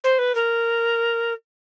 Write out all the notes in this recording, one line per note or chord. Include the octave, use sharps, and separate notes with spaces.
C5
B4
A#4